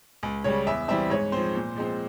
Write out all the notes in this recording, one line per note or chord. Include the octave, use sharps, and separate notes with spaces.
C#2
C#3 G3 C#5
E2 E5
E3 G3 C4 E5
G#2 C#5
F3 C4 C5
A#2
F3 G#3 C4